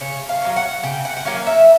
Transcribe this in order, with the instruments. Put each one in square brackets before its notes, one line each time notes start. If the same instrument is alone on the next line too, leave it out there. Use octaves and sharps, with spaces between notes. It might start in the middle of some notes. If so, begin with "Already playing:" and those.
[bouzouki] C#3 C#5
F5
F#3 A#3 C#4
F#5
C#3 G5
F#5
F#5
F#3 A#3 C#4 F5
E5